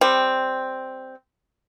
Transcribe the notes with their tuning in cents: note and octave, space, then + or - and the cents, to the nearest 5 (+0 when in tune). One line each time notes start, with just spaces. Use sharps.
G3 +10 C4 +0